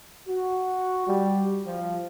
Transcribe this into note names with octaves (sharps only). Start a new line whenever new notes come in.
F#4
G3
F3